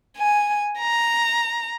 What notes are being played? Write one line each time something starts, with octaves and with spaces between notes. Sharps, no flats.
G#5
A#5